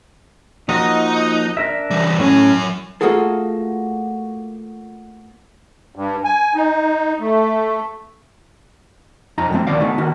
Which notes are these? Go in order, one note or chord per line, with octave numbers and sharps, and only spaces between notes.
F3 A#3 D#4 F#4
D4 A#4 E5
E3 G3
A2 F#3 C#4 G#5
A3 A#3 F4 F#4 G#4 A4
G2
G#5
D#4
A3
F2 D#4 A#5
D3 F3 G#3 A3 C4
D2 D#3 A#3 D5 F5
A3 B3 D#4
D#3 A#3 F#4